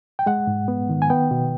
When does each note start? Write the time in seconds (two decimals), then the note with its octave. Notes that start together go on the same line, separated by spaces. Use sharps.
0.19 G5
0.26 G#3 F#5
0.47 G#2
0.68 B3
0.89 D#3
1.02 G#5
1.10 B3 G5
1.31 B2